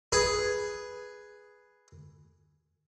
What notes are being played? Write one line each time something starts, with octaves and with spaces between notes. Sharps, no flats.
G#4 B4